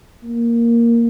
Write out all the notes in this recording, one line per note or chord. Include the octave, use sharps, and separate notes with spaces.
A#3